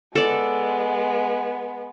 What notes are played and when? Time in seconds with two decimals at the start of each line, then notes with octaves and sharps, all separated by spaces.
0.15 G#3 B3 A4 D5